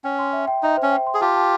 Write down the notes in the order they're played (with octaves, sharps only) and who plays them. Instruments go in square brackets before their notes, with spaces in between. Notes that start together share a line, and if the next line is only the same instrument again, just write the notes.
[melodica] C#4 [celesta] G5
[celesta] C6
E5
G5
[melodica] D#4 [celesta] E5
[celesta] C5
[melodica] C#4
[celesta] G5
C6
[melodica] G#4
[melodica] F4 G4 [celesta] A5
[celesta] A5